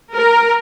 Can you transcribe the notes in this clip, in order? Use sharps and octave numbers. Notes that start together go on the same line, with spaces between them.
A#4